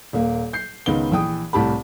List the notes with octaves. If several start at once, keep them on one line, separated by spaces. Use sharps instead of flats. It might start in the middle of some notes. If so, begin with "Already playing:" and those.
D#1 A#3
G6 C7
C#2 D#3 B3 G7
A#1 E3 G5 D#6
C2 A2 G4 A5 B5